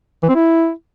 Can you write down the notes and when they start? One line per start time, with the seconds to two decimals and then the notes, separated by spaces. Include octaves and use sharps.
0.23 E3
0.29 C4
0.35 E4